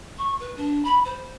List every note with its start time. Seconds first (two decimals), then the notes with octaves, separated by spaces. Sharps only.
0.18 C#6
0.40 B4
0.57 D4
0.85 B5
1.05 C5